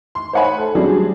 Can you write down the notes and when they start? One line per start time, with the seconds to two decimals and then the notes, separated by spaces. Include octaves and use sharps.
0.15 C6
0.33 C5 C#5 F#5 G#5 B5
0.58 A4
0.75 F#3 G3 C4 D4 F#4 G#4